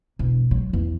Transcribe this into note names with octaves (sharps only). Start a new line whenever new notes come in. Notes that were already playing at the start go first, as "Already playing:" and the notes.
E1
F#3
E2